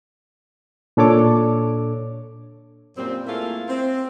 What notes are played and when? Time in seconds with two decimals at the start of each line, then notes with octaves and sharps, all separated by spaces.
0.97 A#2 D4 A4 C#5 D6
2.96 F#2 A#2 G3 C4
3.26 A3 A#3 E4 F4 G#4 A#4
3.68 C4